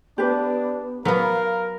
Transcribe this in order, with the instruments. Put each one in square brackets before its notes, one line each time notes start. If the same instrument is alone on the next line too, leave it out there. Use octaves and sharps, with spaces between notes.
[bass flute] B3 [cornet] D4 [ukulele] G4 B4
[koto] F#3 B3 [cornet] A#4 [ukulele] B4 [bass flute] F5